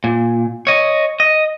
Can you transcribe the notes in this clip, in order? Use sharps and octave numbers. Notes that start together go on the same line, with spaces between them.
A#2
C#5 D#5
D#5